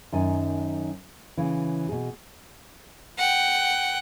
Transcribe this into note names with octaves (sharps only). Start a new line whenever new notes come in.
F#2 D#3 G#5
C#3 E3
B2 G#4
F#5 G5